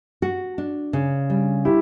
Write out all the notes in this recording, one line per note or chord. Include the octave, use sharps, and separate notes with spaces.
F#4
D4
C#3
G3
D4 E4 G4